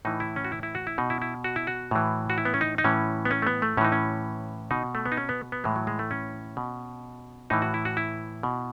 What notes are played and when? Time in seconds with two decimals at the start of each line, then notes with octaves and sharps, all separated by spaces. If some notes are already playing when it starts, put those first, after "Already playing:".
0.05 A2 E3 D#4
0.20 E4
0.36 C#4
0.45 F#4
0.52 E4
0.63 E4
0.75 F#4
0.87 E4
0.98 B2 D#4
1.10 E4
1.22 E4
1.44 F#4
1.56 E4
1.67 F#4
1.91 A2 E3
2.30 F#4
2.38 E4
2.45 B3
2.54 C#4
2.61 D#4
2.78 D#4
2.84 A2 E3 C#4
3.25 B3
3.31 C#4
3.42 A3
3.47 B3
3.62 A3
3.77 A2 C#4
3.81 E3 D#4
3.92 C#4
4.71 B2 D#4
4.95 A3
5.06 B3
5.12 D#4
5.17 C#4
5.29 B3
5.52 B3
5.64 A2 E3 G#3
5.76 F#3
5.87 G#3
5.99 A3
6.11 C#4
6.57 B2
7.50 A2 E3 D#4
7.62 F#4
7.74 E4
7.85 F#4
7.97 E4
8.43 B2